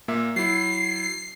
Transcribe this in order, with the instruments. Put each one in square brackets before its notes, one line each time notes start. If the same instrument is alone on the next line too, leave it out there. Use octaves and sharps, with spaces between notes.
[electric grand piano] A#2 A#3 E5
[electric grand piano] F#3 E4 [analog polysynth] C7